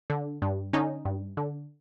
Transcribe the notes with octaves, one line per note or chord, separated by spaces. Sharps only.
D3
G2
D3 C#4 D#4
G2
D3